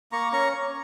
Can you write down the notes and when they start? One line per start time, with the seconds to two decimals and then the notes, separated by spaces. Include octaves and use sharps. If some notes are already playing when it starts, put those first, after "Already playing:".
0.12 A#3 A#5 C#6
0.32 C#4 A#5 C#6